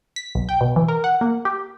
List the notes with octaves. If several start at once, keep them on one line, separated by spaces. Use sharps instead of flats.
B6
B1
G5
B2
E3
A#4
F#5
A#3
G4